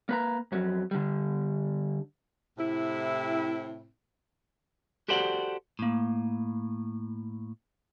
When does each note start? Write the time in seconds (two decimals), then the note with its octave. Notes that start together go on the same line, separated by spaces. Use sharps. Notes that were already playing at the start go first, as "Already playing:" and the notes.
0.09 A#3 B4 A#5
0.52 F2 F#3
0.91 D3 G3
2.58 A2 C3 C4 E4
5.08 F#4 G4 A4 C5 D5 F#5
5.79 A2 A#3